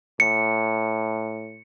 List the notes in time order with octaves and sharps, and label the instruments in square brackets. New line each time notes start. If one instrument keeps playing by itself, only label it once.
[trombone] A2 [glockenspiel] C#7